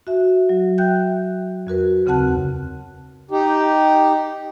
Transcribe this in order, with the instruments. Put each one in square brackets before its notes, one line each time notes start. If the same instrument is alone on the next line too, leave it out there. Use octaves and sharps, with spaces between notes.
[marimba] F#4 E5
F#3
E5 G5 F#6 G6
F2 F#4 A#4 B4
D#2 C#3 C4 F#5 A5 F#6
[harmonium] D#4 G4